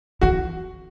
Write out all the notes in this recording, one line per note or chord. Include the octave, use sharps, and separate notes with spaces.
E3 F#4